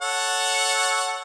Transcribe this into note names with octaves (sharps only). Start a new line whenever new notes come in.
A4 C#5 F#5